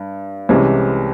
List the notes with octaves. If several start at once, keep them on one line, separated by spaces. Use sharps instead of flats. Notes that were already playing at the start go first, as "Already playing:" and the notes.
Already playing: G2
C2 C3 E3 G#3 C#4